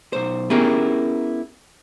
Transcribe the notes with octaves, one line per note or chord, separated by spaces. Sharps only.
B1 C5
B3 C#4 E4 G4 G#4 A#4